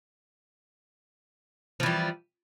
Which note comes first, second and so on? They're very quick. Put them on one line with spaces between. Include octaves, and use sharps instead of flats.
F3 E3 G3